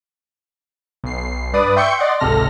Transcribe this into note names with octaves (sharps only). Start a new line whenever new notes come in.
B1 C7
G2 B4 D5 D#6
E5 G5 C6 C#6 G6 C#7
D5 D#5 F#5 C6
G#1 C#2 C3 A4 F6 A#6